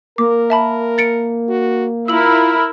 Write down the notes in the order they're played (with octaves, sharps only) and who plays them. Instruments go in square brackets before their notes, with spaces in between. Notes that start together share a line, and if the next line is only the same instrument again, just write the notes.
[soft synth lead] A#3 [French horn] A#4 [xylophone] D6
[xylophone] E5 A5 B5
A6 C#7 D7
[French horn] F#4
[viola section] E4 A#4 [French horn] F4 [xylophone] E6 F#7